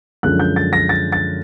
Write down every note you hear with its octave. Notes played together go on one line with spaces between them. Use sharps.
F#2 D3 F3 G#3 C#4 F#6
G6
A6
A#6
A6
A6